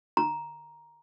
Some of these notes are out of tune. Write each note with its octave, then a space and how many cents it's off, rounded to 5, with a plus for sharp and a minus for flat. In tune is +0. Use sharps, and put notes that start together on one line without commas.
A#5 +10